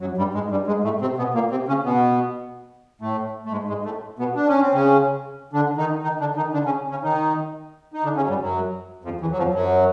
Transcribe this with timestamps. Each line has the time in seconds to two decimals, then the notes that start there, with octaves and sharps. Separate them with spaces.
0.01 F#2 F#3
0.17 G2 G3
0.34 G#2 G#3
0.51 G2 G3
0.67 G#2 G#3
0.84 A2 A3
1.01 C3 C4
1.18 B2 B3
1.34 A#2 A#3
1.51 C3 C4
1.68 C#3 C#4
1.84 B2 B3
3.01 A2 A3
3.45 A3
3.52 G#2 G#3
3.68 G#2 G#3
3.85 A2 A3
4.19 B2 B3
4.35 D4
4.48 C#4
4.61 C4
4.73 C#3 C#4
5.53 D3 D4
5.77 D#3 D#4
6.03 D#3 D#4
6.20 D3 D4
6.36 D#3 D#4
6.53 D3 D4
6.66 C#3 C#4
6.91 C#3 C#4
7.03 D#3 D#4
7.94 D#4
8.04 D3 D4
8.16 C#3 C#4
8.24 F#3
8.28 G2 G3
8.41 F#2 F#3
9.04 F2 F3
9.21 E2 E3
9.31 F#3
9.38 F2 F3
9.54 F#2 F#3